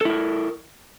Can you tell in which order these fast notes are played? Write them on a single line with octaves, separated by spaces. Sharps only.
A4 E4 A#4